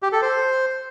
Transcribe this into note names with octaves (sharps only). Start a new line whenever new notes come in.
G4
A4
C5